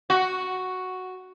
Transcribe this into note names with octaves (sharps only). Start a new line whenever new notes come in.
F#4